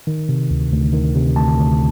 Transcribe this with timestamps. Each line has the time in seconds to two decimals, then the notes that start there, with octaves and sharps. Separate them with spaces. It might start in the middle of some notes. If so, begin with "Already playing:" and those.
0.07 D#3
0.29 C3
0.51 D2
0.72 D2
0.93 D#3
1.15 C3
1.36 D2 A5
1.58 D2